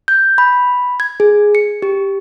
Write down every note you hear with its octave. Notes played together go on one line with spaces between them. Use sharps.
G6
B5
G#6
G#4
C#7
G4